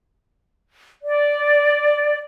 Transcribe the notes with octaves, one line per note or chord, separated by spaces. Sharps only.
D5